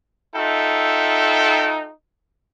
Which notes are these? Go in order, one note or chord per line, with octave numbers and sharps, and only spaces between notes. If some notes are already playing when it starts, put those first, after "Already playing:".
D#4 F4 A4 E5 G5